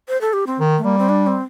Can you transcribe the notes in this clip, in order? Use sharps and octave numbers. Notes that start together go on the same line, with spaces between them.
C5
A4
G4
C4
D#3
A3
G3 A#3
C4
D4
C4